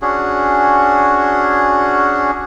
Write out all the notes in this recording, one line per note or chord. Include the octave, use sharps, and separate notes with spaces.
C#4 D4 F#4 G#4